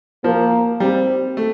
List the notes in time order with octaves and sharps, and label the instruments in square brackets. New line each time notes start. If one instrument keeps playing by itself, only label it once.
[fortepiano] F3 [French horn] A#3
[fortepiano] G3 [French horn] C4
[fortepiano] A3